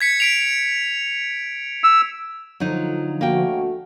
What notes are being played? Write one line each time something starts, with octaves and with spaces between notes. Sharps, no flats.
G#6 B6 C#7
B6 D7 F7
E6
D3 F3 F#3 D#4
D2 A3 A#3 F#4 G5